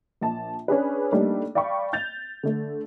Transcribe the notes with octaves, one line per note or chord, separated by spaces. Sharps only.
A#1 A5
C#4 D4 G#4 B4
G3 A3 A#3 D4 D#4
D5 F5 G5 B5 C#6
G6 A6 F7
D3 A3